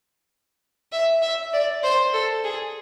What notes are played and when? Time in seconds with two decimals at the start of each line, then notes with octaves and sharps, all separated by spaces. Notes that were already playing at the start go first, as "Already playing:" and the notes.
0.92 E5
1.22 E5
1.53 D5
1.83 C5
2.13 A4
2.44 G#4